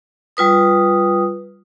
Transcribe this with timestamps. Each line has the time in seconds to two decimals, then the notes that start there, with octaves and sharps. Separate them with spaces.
0.37 G3 F4 B4 D#6